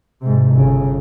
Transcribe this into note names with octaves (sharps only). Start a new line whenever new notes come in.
G#2 C3
G1 C#3